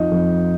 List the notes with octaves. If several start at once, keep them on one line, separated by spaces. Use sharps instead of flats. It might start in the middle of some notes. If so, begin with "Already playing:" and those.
Already playing: F2 F3 D#4
F2